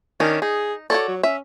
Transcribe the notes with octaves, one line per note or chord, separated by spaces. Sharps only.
D#3 C#4 D4
D#4 G#4
F#4 A4 C#5 D5
F#3
C#4 E5